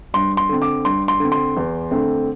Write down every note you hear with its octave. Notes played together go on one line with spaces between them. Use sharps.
G2 C6
C6
D3 C4
D6
G2 C6
C6
D3 C4
C6
E2
D3 A3 C4